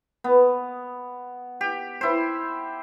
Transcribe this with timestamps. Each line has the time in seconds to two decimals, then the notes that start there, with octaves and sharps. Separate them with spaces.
0.24 B3
1.61 G4
2.01 E4 C5